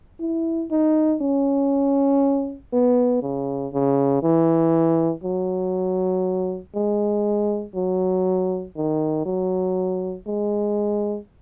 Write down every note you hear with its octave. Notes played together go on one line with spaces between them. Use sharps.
E4
D#4
C#4
B3
C#3
C#3
E3
F#3
G#3
F#3
D#3
F#3
G#3